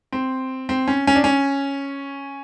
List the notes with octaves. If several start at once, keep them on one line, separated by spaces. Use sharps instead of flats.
C4
C4
C#4
C#4
D4
C#4